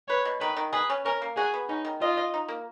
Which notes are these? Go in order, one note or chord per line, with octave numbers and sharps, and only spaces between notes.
B4 C#5
B2
D#3 B4
D#3
G#4 B4
C#4
C#4 A#4
A#3
F#4 G#4
B3
C#4 D#4
D#3
F4 D#5
D#5
D#4
A#3